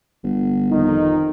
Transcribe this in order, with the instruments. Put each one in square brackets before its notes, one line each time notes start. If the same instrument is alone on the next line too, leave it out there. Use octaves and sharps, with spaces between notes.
[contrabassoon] G1
[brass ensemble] F2 D#3 D#4